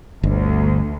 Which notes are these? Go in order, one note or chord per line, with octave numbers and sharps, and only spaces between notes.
G1 D2